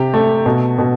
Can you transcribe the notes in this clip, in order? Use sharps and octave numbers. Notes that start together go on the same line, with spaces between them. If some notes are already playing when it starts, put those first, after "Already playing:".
Already playing: C3 G4
A3
B2
B2